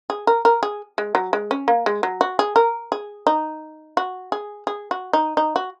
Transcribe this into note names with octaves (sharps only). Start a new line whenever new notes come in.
G#4
A#4
A#4
G#4
G#3
F#3
G#3
C#4
A#3
G#3
F#3
F#4
G#4
A#4
G#4
D#4
F#4
G#4
G#4
F#4
D#4
D#4
F#4